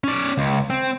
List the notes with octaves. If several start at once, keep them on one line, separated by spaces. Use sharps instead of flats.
C#4 D5
C#2
C4